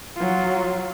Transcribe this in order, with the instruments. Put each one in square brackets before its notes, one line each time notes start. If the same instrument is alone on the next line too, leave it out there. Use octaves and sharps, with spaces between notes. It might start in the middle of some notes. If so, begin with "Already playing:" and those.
[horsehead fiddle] F#3 F4